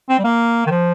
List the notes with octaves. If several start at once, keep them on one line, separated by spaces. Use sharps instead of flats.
C4
G3
A#3
D#3
F3